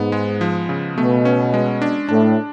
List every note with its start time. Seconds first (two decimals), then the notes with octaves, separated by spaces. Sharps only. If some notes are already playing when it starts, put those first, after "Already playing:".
Already playing: G#2 B3
0.12 G#3
0.41 F3
0.69 C#3
0.97 B2 A3
1.25 C#4
1.54 G#3
1.82 D4
2.09 A2 D4